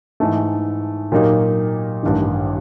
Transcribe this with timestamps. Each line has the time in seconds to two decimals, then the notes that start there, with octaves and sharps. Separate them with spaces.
0.20 G#2 E3 A3
1.12 A#2 F#3 A#3 D#4 G4
2.03 A1 G2 D#3